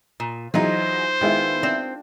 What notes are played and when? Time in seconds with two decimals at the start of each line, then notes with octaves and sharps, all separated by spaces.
0.20 A#2
0.54 E3 F#3 D#4 F4 G#4 C5
1.21 D#3 G#3 B3 E4 F4
1.63 C4 D4